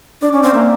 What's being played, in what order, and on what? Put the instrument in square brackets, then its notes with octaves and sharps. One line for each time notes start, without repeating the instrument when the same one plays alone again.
[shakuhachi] D4 [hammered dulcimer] D5
[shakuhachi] C#4
[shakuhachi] C4 [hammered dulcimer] F5
[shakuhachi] A#3 [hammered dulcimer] E5